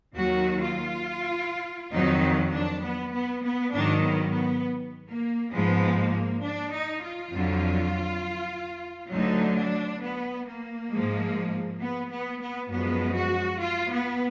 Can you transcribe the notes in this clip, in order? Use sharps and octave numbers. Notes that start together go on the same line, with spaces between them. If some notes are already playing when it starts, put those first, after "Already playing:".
D#2 D#3 F#3 F#4
F4
F2 D#3 F#3 D#4
D4
B3
B3
B3
G#2 D#3 F#3 D4
B3
B3
A#3
G#2 F3 G#3 B3
A#3
D4
D#4
F4
F2 D3 F#3
D2 D3 F#3 D#4
D4
B3
A#3
G#2 F3 G#3
B3
B3
B3
F#2 F3 G#3 B3
F#4
F4
B3